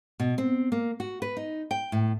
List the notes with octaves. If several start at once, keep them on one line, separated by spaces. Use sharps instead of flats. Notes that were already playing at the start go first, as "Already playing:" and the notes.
B2
C4
A#3
F#4
B4
D#4
G5
A2